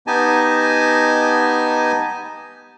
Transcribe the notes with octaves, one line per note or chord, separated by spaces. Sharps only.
B3 D#4 G4 D#5 G#5 A5